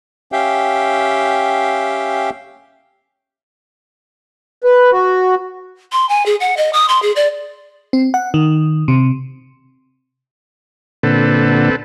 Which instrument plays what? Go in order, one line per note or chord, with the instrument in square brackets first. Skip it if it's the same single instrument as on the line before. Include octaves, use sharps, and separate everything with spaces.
[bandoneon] C#4 G4 E5 F5 G5
[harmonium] B4
F#4
[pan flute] C6
G#5
G#4
F#5
D#5
D#6
C6
G#4
D5
[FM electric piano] C4
F#5
D#3
C3
[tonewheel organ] A#2 D3 [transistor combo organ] C4 A4 B4